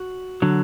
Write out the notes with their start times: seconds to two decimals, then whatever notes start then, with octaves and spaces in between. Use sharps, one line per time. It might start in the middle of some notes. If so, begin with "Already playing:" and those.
Already playing: F#4
0.42 D3 F#3